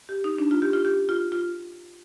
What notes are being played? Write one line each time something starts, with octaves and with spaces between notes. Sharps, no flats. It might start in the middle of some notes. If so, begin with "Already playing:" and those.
G4
D#4
D4
F4
G4
F4
G4
F4
F4